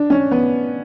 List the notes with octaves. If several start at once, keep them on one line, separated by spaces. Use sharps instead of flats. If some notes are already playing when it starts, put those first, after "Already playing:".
Already playing: D4
C#4
B3